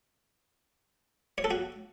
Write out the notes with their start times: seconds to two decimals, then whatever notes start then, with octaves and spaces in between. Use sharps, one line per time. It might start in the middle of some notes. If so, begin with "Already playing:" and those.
1.38 C#5
1.44 A4
1.51 F#4